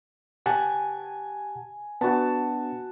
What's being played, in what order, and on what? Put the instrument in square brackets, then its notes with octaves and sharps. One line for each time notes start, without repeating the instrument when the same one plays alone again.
[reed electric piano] G4 F#5 A5 [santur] G#5
[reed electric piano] B3 D4 [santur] F#4 A5